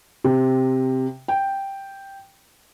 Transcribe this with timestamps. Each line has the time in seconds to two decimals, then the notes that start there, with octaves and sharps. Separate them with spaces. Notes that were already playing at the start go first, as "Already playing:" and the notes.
0.24 C3
1.28 G5